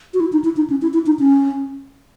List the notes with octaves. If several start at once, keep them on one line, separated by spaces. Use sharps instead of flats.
F#4
E4
D#4
E4
D#4
C#4
E4
E4
D#4
C#4